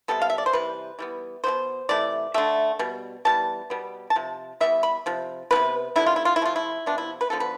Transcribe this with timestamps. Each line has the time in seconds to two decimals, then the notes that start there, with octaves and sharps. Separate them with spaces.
0.08 C3 G3 B3 A4
0.22 F5
0.30 E5
0.38 D5
0.46 C5
0.53 C3 E3 G3 B4
0.99 E3 G3 B3
1.44 B2 G3 B3 C5
1.89 C3 E3 A3 D5
2.34 D3 A3 E5
2.79 B2 G3
3.25 E3 G3 B3 A5
3.70 B2 G3 B3
4.10 A5
4.16 C3 F3
4.61 E3 G3 B3 E5
4.83 B5
5.06 C3 F3
5.51 F3 B3 B4
5.56 C3
5.96 D3 G3 B3 E4
6.06 F4
6.16 E4
6.25 F4
6.36 E4
6.41 C3 F3 A3 F4
6.56 E4
6.86 C3 F3 B3 D4
6.98 E4
7.21 B4
7.30 D3 F3 B3 A4
7.40 B4